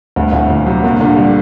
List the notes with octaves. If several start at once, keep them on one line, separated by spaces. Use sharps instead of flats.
D2 G2
D2 A2
D2 A#2
C3 F#3
G2 A#3
A#2 D3
D3 G3